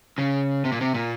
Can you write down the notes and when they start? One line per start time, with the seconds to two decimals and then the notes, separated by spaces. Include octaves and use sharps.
0.18 C#3
0.65 C3
0.72 A#2
0.81 C3
0.94 A#2